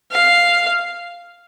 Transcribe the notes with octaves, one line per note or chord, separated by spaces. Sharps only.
F5